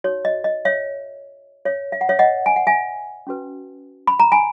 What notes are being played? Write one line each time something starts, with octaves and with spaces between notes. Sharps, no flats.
D#4 F#4 C#5
D#5
D#5
C#5 E5
C#5 E5
E5
F#5
C#5 E5
D#5 F#5
G#5
F#5
E5 G#5
C#4 F#4 B4
B5
A#5
G#5 B5